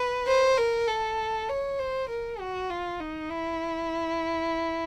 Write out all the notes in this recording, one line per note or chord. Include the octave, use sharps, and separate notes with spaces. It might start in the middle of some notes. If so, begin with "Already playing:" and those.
Already playing: B4
C5
A#4
A4
C#5
C5
A#4
F#4
F4
D#4
E4